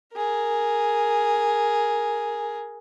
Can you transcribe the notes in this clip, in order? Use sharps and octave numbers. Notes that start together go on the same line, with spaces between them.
G#4 A#4